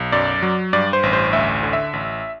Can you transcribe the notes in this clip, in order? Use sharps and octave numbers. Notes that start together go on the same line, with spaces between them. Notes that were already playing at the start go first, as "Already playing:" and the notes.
Already playing: B1
F#2 D5
F#3
G2 D5
C5
A1
C5
D2 E5
D3
E5
A1